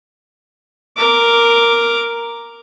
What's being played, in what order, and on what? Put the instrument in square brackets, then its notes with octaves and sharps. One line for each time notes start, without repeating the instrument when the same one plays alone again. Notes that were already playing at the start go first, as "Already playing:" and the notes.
[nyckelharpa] A#4 D6